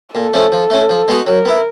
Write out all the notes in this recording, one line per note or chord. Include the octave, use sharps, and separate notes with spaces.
A#2 A4
F3 A3 C#4
F3
A3 C#4
F3
G#3 B3 D#4 F#4
F#3 A#4
B3 E4